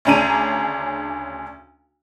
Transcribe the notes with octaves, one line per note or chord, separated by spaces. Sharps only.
D2 C#3 C#4 D4 A#5 D#7